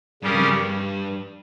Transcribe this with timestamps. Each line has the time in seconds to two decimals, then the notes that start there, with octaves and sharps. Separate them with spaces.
0.22 G2 C#3 G3 C#4 G4 A#4
0.33 F2
0.44 G2